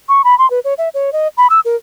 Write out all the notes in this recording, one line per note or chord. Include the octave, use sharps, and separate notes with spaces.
C#6
B5
C6
B4
C#5
E5
C#5
D#5
B5
E6
A#4